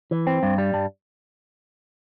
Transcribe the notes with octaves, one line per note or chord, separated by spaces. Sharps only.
E3
C4
G2
G3
G2